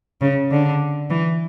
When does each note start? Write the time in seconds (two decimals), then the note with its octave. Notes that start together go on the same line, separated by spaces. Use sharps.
0.21 C#3
0.51 D3
1.10 E3